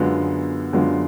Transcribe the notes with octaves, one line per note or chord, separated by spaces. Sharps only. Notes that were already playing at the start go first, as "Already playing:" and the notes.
Already playing: F#2 D3 G#3 B3 F4
F#2 D3 G#3 B3 F4